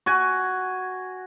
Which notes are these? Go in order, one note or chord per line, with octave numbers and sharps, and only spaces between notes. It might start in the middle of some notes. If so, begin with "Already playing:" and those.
F#4 G#5